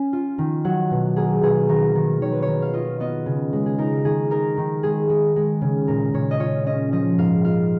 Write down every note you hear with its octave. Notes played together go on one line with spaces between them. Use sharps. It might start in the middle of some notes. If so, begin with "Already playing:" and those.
Already playing: C#4 G#5
F4
D#3
F#3 F#5
B2
A#3 G#4
B2 G#4
D#3 A#4
D#3
D#3 C#5
B4
C#5
D#3
F5
F4 D#5
B3 D#5
C#3
G#3
G#4
D#4 A#4
D#3 G#4
D#4 A#4
D#3
G#3 G#4
G#3
G#3
C#3
A#2 A#4
A#2 C#5
D#5
F4 C#5
C#4 D#5
F3 D#5
G#2 F5
F4 F5